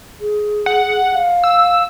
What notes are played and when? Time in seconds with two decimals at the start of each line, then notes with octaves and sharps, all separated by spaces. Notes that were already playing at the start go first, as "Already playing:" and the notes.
0.21 G#4
0.66 F#5
1.14 F5
1.44 E6